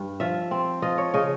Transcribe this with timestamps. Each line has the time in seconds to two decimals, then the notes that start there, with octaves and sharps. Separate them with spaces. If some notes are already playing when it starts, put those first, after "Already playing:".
Already playing: G2
0.20 F3 E5
0.51 C4
0.82 F3 D#5
0.98 C#5
1.14 C#3 D#5